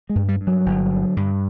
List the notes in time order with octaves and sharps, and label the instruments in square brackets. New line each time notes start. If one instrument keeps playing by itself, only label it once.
[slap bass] G#3
G2
G3
G2
F#3
G1
D3
G2